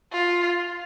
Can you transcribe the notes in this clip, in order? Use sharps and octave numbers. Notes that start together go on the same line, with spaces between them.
F4